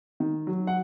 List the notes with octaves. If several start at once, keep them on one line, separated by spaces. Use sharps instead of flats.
D#3
F#3
F#5